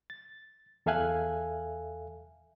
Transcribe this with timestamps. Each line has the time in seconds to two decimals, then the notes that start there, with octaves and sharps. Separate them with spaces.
0.10 A6
0.86 E2 A4 E5 F5 G#5 F#6